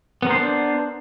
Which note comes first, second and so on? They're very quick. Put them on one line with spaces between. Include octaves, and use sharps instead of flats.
B3 A#4 C5 D4